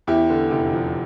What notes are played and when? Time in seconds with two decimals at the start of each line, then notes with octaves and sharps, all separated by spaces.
0.07 E2 E4 G4
0.30 D3
0.51 F1 E4 G4
0.73 F3